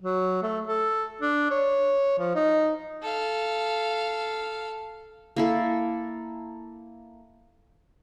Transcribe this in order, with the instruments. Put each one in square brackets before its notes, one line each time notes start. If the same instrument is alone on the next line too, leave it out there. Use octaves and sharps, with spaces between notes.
[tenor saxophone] F#3
A3
A4
D4
C#5
F3
D#4
[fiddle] A4 F5
[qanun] A#3 E4 A4